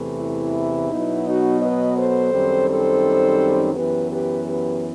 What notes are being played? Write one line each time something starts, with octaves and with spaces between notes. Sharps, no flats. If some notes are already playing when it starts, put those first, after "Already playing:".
Already playing: E2 C3 E3 A3
E4
B2 F#3 B3 D#4
D#4 F#4
B4 D#5
A4 C5
F#2 D#3 G3 C4 D#4
A4 C5
F#2 E3 B3 G4 B4
G4 B4
G4 B4